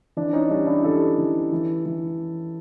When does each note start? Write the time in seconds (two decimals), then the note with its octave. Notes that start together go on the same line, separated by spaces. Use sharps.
0.17 E3 D4
0.33 C#4 D#4
0.50 G3 D4
0.67 D4 E4
0.84 E3 G4 A4
1.18 E3
1.52 E3
1.86 E3